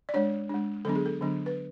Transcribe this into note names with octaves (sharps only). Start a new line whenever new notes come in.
D5
G#3 D4 C#5
G#3 D4
D3 F#3 B3 D4 A4
G#4
A4
D3 F#3 B3 D4
B4